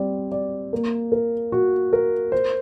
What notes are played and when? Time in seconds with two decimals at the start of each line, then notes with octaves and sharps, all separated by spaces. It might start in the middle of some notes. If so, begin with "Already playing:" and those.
Already playing: G3 C4 D5
0.32 D5
0.73 A#3
1.12 A#4
1.52 F#4
1.93 A#4
2.32 C5